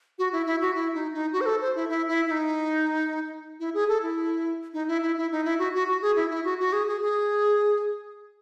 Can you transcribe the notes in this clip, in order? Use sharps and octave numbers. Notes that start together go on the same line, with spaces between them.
F#4
E4
E4
F#4
E4
D#4
D#4
F#4
C5
A4
C5
E4
E4
E4
E4
D#4
E4
G#4
A4
E4
D#4
E4
E4
E4
D#4
E4
F#4
F#4
F#4
G#4
E4
E4
F#4
F#4
G#4
G#4
G#4